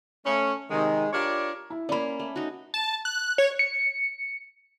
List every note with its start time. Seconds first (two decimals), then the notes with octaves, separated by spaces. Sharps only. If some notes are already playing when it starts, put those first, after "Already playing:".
0.25 A3 C#4
0.70 C3 D#3 G#3
1.13 D4 F4 G4 A#4 C#5 D5
1.70 E4
1.89 A#3 C#4 D5 B5
2.19 A3
2.36 D#4 F#4
2.74 A5
3.05 F#6
3.38 C#5
3.59 C#7